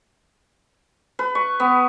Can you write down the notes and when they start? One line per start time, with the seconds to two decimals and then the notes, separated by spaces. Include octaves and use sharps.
1.19 B4
1.35 C#6
1.60 B3